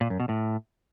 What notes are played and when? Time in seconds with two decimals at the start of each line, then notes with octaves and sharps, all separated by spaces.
0.01 A#2
0.10 F#2
0.20 B2
0.29 A2